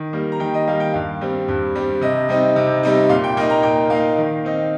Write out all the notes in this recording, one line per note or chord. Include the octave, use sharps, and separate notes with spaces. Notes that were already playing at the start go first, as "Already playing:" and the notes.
Already playing: D#3
G3 A#3
A#5
D#3 G5
D#5
G3 A#3 F5
G5
G2 F5
G3 C4
G2
G3 C4
C3 D#5
G3 C4 D#4
C3
G3 C4 D#4
A#2 F5
G5
A#3 D#4 G5
A#5
A#2 G5
A#3 D#4 F5
D#3
C4 D#4